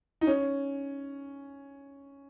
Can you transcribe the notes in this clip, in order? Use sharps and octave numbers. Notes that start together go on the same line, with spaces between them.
D#4
C#4